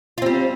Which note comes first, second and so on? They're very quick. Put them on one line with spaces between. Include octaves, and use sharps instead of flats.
F4 C4 G3